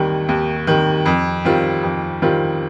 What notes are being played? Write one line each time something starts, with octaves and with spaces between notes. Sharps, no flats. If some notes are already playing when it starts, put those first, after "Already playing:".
Already playing: D#2 D#3 G3
D#2
D#3 G3
F2
D#3 G3 C4 F4
F2
D#3 G3 C4 F4